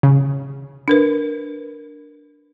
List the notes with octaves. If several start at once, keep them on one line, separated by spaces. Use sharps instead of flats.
C#3
D4 A#4 B4